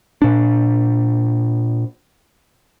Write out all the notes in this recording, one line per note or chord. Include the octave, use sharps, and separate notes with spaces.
A#2 D4